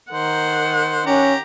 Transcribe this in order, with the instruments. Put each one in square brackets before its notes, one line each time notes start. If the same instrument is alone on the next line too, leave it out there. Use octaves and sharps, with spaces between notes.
[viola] D#3 F#5 [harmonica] C5
[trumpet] C#4 [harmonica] G4 A#5